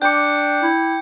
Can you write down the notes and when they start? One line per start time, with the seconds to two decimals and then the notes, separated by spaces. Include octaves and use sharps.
0.02 D4 G5 D6 G6 C#7
0.63 E4